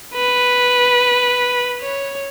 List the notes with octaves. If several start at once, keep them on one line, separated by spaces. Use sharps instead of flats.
B4
C#5